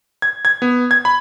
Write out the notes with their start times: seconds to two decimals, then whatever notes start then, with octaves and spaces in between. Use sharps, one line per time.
0.22 G#6
0.45 G#6
0.62 B3
0.91 G#6
1.05 B5